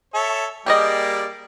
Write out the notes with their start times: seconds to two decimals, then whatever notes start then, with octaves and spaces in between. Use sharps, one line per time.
0.14 A4 C#5 E5
0.66 G3 A#3 G4 G#4 D5 D#5